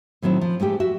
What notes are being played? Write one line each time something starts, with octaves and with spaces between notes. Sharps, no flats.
A2 D#3 F#3 C4 E4
F3
G#2 G#3 A3 G4
F#4 E5